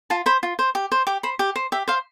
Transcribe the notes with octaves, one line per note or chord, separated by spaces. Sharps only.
F4 A5
C5 B5
F4
C5
G4
C5
G4 D6
C5 B5
G4
C5
G4 E5
C5 F5